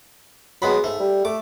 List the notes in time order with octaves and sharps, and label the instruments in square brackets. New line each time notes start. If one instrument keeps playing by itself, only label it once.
[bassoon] F#3 [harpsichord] G#3 B3 B5
[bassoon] G#2 [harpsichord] A3
[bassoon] G3
[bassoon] A3 [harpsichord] D6